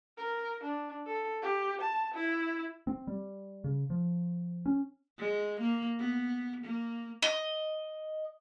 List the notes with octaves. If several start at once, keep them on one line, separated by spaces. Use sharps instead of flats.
A#4
D4
A4
G4
A5
E4
C4
G3
C#3
F3
C#4
G#3
A#3
B3
A#3
D#5